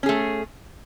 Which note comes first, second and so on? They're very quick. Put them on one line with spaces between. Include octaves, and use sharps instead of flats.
C#4 G#4 A3